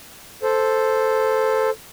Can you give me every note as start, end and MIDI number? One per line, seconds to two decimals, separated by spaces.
0.43 1.70 69
0.43 1.70 72